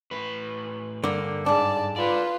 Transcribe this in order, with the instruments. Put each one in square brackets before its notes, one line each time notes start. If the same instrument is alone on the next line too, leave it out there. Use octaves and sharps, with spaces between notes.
[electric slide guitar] A2 B4
[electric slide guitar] G2 [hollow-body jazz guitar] D3 A#3
[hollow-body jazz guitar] G#2 D4 [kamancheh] D5 A5
[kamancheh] F4 B4 [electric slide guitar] A4 D5